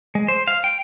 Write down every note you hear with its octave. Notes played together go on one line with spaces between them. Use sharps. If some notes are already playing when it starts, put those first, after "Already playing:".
G#3
C5
F5
G5